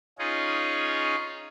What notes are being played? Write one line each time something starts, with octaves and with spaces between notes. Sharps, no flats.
C#4 D#4 F4 G#4 C#5